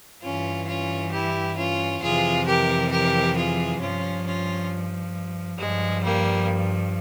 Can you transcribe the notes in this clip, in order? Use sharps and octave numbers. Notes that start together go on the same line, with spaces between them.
G2 E3 C#4 F4
C#4 F4
E4 G4
C#4 F4
F2 C3 E3 F4 G#4
G4 A#4
G4 A#4
F4 G#4
G2 F3 C#4 F4
C#4 F4
G2 F3 G#3
G3 A#3